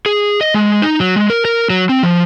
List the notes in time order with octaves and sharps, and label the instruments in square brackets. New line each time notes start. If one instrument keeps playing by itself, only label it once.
[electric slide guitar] G#4
D#5
G#3
D#4
F#3
G#3
A#4
A#4
F#3
C4
F3